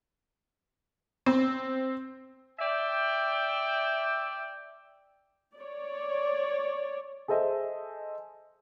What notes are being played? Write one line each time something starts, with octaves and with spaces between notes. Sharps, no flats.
C4
D5 E5 G5
C#5 D5
G#4 A4 C5 D#5 E5